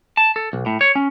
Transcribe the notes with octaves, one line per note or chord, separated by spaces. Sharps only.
A5
A4
B1
A2
C#5
C#4